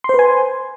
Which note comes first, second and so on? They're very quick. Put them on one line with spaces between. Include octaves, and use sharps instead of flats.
C6 C5 B4 G#5